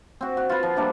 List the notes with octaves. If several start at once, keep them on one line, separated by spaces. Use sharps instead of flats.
C4 F#4
F#4
F4 B4
F3
G3 A#3 D4 E4